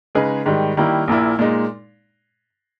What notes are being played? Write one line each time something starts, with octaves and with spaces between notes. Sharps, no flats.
C#3 G#3 D#4 G#4 B4
G#2 D#3 G3
D#3 G3 A#3 E4
A#1 A#2 A#3 E4
A#2 G#3 D#4